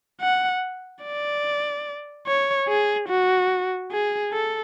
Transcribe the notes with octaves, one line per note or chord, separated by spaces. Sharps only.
F#5
D5
C#5
G#4
F#4
G#4
A4